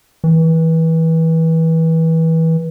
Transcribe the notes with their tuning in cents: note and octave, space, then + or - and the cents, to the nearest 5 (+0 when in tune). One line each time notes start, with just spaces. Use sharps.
E3 -25